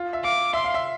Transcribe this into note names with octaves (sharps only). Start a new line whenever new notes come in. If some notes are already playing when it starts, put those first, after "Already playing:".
Already playing: F4
E5
F5 D6
E5 C6
F5
E5